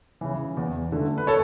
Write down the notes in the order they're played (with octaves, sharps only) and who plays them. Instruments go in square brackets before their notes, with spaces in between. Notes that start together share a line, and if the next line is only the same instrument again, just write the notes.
[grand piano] C#3 E3
E2
D3 A3
B4
A4 C#5